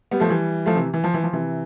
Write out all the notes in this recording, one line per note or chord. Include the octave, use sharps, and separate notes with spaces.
G3 B3
F3 A3
E3 G3
F3 A3
C3 E3
E3
F3
E3
F3
C3 E3